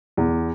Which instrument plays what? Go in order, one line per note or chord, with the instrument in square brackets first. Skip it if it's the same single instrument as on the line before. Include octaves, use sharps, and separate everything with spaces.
[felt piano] E2